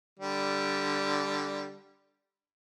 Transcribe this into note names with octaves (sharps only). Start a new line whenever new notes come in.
D3 G3